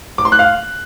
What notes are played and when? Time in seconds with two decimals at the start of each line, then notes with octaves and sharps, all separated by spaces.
0.18 D6
0.25 C6
0.32 F#6
0.39 F5